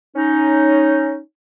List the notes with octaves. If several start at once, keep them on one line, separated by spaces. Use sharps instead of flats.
C#4 D#4